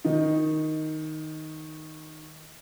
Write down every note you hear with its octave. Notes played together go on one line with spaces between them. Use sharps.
D#3 D#4